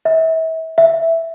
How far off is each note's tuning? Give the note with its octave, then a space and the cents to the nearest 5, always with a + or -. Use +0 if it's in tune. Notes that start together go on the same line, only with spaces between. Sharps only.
E5 -35
E5 +0